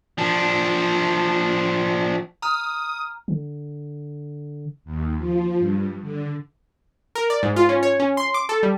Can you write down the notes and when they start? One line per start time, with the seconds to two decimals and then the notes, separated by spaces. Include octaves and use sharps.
0.18 F3 D4
2.42 A#5 D#6 F6
3.28 D3
4.85 D#2
5.17 F3
5.59 G2
6.02 D3
7.15 A#4
7.30 D5
7.43 G#2
7.56 F4
7.69 C#4
7.83 C#5
8.00 C#4
8.17 C6
8.34 D6
8.49 A4
8.63 G3